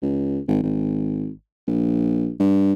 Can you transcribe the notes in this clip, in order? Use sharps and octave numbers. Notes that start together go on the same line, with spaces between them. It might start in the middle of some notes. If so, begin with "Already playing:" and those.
C#2
G#1
G#1
A#1
G2